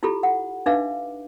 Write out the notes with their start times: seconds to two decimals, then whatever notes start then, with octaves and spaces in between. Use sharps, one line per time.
0.03 E4 F4 G4 A4 B5
0.23 F#5
0.66 D4 D#4 B4 E5 F5 D6